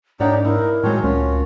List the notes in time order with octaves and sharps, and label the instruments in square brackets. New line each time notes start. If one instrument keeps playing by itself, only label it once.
[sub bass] G#2 [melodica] A#3 D#4 G4 [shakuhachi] D4 [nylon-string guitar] C#5 D5 F#5
[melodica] D#4 [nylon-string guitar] E4 [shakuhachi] A#4
[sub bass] A2 [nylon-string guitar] D#3 F#3 G#3 [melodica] C4 D4 C#5
[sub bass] C#2 [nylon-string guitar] C#4 [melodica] F4 F#4